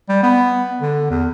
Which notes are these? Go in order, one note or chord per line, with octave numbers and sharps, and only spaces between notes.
G3
B3
D3
E2